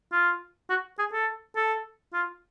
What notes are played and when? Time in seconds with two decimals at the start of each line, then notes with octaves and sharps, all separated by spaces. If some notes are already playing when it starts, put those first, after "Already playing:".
0.12 F4
0.70 F#4
0.99 G#4
1.13 A4
1.56 A4
2.13 F4